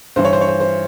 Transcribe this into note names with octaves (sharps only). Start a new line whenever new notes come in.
G2 E3 C5
C#5
C5
C#5
C5
C5